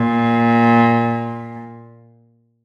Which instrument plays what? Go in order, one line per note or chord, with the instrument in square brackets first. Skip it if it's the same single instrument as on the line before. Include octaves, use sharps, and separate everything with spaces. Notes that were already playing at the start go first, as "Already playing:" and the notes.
Already playing: [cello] A#2